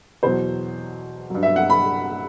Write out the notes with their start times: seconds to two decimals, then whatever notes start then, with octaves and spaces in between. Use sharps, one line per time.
0.23 E2 B2 F#3 C5
1.30 G2 F#3
1.43 E5
1.56 F#5
1.70 B5